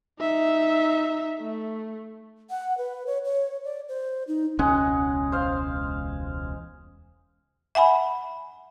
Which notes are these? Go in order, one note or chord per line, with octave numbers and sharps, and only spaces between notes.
D#4 E5
A3
F#5
B4
C#5
C#5
D5
C5
D#4
E1 C#2 G#3 C#4 G#4 F#5
C5 F5
E5 F#5 G#5 B5